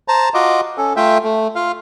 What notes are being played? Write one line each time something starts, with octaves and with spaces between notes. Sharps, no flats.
C5 A5 A#5
F4 F#4 D#5 D6
C#4 A4
A3 F4 E5 G5
A3
F4 F5